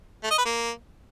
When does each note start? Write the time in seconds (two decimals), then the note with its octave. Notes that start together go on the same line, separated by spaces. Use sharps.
0.23 A3
0.31 D#5
0.38 B4
0.45 A#3